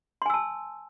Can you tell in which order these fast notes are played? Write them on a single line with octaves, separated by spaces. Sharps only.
C6 G#5 E6 A5